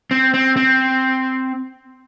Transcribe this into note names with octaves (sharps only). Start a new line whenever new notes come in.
C4
C4
C4